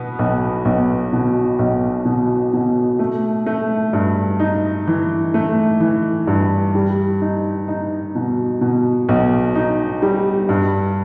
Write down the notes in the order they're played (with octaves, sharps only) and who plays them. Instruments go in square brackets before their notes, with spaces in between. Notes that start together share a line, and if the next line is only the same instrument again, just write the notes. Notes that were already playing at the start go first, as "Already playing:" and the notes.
Already playing: [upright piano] B2 B3
B1
B1
B2
B1
B2
B2
A3
A3
G2
D#4
E3
A3
E3
G2
G3
D#4
D#4
B2
B2
B1
D#4
G3
G2